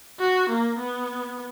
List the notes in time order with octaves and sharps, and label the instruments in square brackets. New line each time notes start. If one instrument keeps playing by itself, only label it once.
[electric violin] F#4
A#3
B3